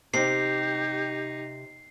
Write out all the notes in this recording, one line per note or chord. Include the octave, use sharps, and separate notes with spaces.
C3 D#4 G4 C7